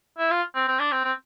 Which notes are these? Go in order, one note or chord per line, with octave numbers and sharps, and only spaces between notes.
E4
F4
C4
C4
D4
C4
C4